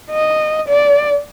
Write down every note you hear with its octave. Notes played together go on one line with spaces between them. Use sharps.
D#5
D5